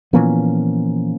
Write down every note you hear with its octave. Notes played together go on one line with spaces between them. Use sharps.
A#2 E3 F3 A#3 B3 C#4